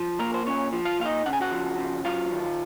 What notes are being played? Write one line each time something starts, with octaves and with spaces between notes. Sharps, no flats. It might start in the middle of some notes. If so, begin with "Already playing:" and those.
Already playing: F3
A#2 A#3 A#4
C5
A#2 C#4 C#5
F3
F4 F5
A#2 F5
D#4 D#5
C#3 F#5
G#5
F#4 F#5
F3
C#3
F#3 F4 F5
D#3